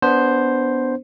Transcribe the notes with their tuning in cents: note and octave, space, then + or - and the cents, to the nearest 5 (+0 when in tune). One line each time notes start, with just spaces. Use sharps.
B3 +0 D4 -20 C5 +0